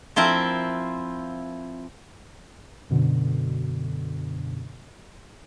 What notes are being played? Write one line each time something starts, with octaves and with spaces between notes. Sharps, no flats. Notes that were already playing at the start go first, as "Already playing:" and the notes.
F3 C4 E4 A#4
F#2 B2 D3